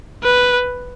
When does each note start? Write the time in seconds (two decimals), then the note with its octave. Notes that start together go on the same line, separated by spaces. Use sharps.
0.23 B4